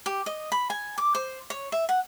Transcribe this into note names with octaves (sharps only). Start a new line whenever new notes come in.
G4
D#5
B5
G#5
D6
C5
C#5
E5
F#5